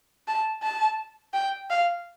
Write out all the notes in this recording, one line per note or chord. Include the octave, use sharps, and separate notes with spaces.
A5
A5
G5
F5